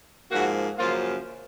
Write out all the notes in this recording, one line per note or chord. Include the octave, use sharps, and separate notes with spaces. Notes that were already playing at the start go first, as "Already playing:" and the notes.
G#2 F3 A#3 F#4
F#2 C#3 F3 A#3 F4